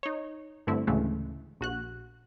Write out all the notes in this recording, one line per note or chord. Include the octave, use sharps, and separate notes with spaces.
D#4 C#5
G2 D3 A3 C4 E4
D2 A2 C#3 E3 G#3 A3
A#1 F#4 F#6